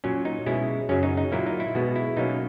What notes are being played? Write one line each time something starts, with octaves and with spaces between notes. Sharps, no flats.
A#2 F#3 C#4
D#4
B2 G#3 C#4 E4
F#2 C#3 F#3 C#4
D#4
D#4
A#2 F#3 A#3 E4
D#4
E4
B2 G#3 B3 F#4
E4
B2 F#3 A#3 C#4 D#4